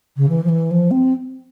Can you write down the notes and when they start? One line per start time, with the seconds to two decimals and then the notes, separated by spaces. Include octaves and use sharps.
0.17 C#3
0.29 E3
0.44 F3
0.49 E3
0.71 F3
0.91 C4